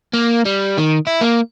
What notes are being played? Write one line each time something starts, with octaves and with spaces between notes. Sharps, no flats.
A#3
G3
D#3
E4
A#3